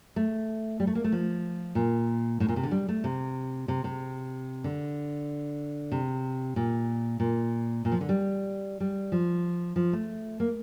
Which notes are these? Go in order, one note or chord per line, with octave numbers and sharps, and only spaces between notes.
A3
G3
A3
A#3
A3
F3
A#2
A2
A#2
C3
D3
G3
A3
C3
C3
C3
D3
C3
A#2
A#2
A#2
F3
D3
G3
G3
F3
F3
A3
A#3